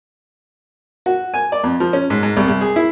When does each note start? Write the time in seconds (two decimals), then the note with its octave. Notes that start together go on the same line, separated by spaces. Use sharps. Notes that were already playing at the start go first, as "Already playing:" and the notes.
1.06 F#4
1.34 G#5
1.52 D5
1.64 F2
1.80 F3
1.93 C#4
2.10 G#2
2.23 G#2
2.37 C2
2.48 C2
2.61 G#4
2.76 E4